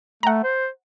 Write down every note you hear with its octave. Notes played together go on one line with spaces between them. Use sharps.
A3 F#5 A#5
C5